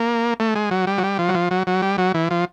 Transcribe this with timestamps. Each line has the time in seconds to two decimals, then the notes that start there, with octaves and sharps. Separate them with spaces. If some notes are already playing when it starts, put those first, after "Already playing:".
Already playing: A#3
0.40 A3
0.55 G#3
0.71 F#3
0.87 G3
0.98 F#3
1.03 G3
1.19 F3
1.29 F#3
1.34 F3
1.51 F#3
1.67 F#3
1.82 G3
1.98 F#3
2.14 E3
2.31 F3